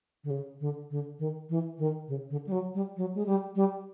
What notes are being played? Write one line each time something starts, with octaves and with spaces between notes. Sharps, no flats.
D3
C#3
D3
D3
D#3
E3
D#3
C#3
D3
G3
F#3
G3
F#3
G#3
G3
G3